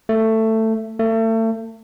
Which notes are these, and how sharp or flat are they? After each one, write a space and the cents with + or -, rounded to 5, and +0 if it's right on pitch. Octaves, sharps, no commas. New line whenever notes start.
A3 +15
A3 +35